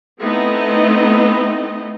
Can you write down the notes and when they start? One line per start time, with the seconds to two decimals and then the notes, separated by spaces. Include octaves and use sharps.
0.21 A3 B3 C4 D#4 E4 D#5